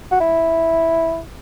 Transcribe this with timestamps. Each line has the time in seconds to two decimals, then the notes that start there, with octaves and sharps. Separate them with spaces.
0.12 F#4
0.20 E4